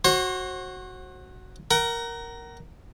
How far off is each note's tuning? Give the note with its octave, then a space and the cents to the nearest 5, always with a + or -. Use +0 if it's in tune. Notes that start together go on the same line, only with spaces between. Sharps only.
F#4 +0 C5 +40
A#4 +0 F#5 +35